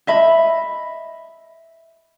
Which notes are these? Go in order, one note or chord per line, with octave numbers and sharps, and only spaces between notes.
D#5 E5 B5